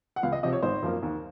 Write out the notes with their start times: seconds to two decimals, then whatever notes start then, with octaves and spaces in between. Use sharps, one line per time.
0.16 F#5
0.23 C#2 F5
0.32 D#5
0.43 C3 F3 C4 D#5
0.53 C#5
0.63 G#1 C5
0.82 F#2 F3 A#3
1.03 D#2